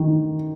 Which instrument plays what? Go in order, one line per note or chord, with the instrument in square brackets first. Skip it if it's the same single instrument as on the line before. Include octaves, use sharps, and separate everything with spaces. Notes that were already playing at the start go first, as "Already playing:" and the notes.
Already playing: [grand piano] D#3